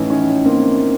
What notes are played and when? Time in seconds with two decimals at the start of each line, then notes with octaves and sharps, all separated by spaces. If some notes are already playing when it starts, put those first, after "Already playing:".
Already playing: A2 E3 A3 C#4 D#4
0.10 C#4 D#4
0.46 A#3 C4